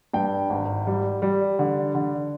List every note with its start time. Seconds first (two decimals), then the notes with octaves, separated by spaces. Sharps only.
0.13 G2 G5
0.50 G#1
0.87 G3
1.22 G3
1.59 D3
1.95 D3